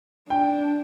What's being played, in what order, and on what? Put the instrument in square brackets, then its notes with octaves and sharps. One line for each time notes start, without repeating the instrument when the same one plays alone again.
[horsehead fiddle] D4 [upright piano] G5